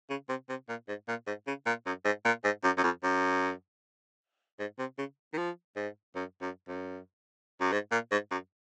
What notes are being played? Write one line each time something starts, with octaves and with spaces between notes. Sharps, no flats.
C#3
C3
C3
A#2
G#2
A#2
G#2
C#3
A#2
F#2
G#2
A#2
G#2
F#2
F#2
F2
F#2
G#2
C3
C#3
D#3
F3
G#2
F#2
F#2
F#2
F#2
G#2
A#2
G#2
F#2